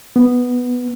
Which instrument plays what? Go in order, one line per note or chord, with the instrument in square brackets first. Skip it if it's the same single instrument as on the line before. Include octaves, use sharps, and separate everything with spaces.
[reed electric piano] B3